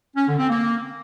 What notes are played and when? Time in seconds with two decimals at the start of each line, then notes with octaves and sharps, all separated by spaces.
0.16 C#4
0.27 D3
0.38 C4
0.49 A#3